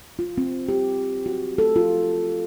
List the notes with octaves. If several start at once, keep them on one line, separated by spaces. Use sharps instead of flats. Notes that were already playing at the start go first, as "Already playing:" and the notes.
F4
C4
G4
F#4
A4
F4